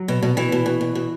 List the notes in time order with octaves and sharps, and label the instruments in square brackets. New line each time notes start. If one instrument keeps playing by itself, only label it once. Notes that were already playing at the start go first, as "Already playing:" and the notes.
Already playing: [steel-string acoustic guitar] F#3
B2
B2
B2 E3
B2
B2
B2
B2